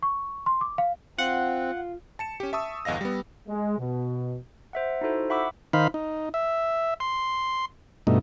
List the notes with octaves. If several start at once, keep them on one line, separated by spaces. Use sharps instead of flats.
C#6
C6
D6
F5
C4 F4 F#5
A5 C#7 E7
C#4 G4
E5 A5 C#6 D#6 E6
G1 E2 D#5 F5 A#6
G3 B3
G#3
B2
C5 E5 F#5
D#4 E4 F#4 A4 C5
E5 F#5 B5 C#6 D6 E6
D#3 D#4 C5 F5 B5
D#4
E5
C6
G2 B2 A3 D#4